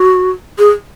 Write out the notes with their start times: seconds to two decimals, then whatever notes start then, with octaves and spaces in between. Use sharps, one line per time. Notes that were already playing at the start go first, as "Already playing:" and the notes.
Already playing: F#4
0.59 G#4